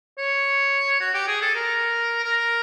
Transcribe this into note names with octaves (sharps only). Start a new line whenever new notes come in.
C#5
F#4
G4
G#4
A4
A#4
A#4